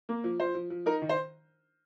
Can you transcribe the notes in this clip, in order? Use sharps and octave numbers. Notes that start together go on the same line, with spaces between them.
A#3
F3
F3 C5
F3
F3
D#4 A#4
D#3
C5